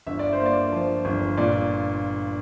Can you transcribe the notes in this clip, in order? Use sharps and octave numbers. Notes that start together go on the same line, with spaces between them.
G1 E5
D5
C5
A#3
D5
F3
G1
A#2 D5